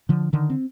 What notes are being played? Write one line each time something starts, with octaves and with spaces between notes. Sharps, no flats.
D3 F3
D3 D#3
C4